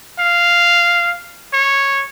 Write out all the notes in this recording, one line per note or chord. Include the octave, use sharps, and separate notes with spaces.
F5
C#5